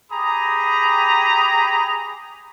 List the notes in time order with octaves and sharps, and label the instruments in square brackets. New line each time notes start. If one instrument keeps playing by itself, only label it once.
[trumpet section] G4 G#4 A#5 B5 D#6